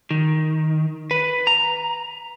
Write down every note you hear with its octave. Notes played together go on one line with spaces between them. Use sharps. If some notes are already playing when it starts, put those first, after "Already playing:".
D#3
B4
A#5